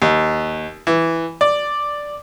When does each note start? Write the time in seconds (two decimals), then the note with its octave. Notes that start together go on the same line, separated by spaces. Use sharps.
0.02 D#2
0.87 E3
1.41 D5